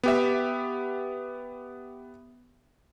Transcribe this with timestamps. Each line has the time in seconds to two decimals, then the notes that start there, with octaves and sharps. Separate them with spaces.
0.04 B3 G4 E5